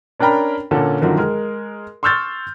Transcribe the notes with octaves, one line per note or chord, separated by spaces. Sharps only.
C#4 D4 A#4 G5 A#5 B5
A#2 D3 C#4 A4
F#2 D3 D#3 F3
G#3 A#4
C6 C#6 E6 F6 G6 A6